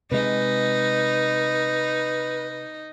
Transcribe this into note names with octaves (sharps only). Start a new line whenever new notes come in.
C3 G#3 D#4 B4